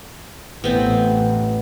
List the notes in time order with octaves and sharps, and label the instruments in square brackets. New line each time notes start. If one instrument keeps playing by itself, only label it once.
[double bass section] A1 [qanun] B3 C4